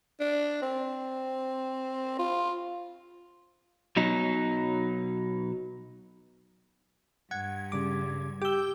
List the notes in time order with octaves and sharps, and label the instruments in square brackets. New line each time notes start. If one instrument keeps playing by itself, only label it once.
[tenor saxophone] D4
C4
F4
[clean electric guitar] B1 B2 F#3 D#4
[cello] G2 [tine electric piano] F#5 [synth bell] G#6
[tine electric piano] C#3 G3 D6
[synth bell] G4 G7 [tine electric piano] D6 E6